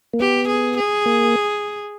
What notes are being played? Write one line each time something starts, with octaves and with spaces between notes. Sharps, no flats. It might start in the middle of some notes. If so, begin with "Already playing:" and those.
A#3
B3 G4
G#4
G#4
A#3